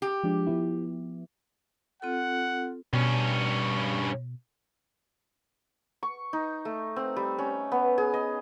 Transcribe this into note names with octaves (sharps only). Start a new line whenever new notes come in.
G4
F3 G#3 D4
F3 B3 E4
C4 F4 A4 F#5
G2 B2 C#4
C#6
D#4
A3
C4
G3
C#4
B3
G#4
D#5